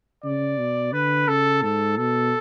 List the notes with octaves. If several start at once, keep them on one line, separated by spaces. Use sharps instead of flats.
C#3 D5
B2
D3 B4
C#3 A4
G#2 A4
B2 A4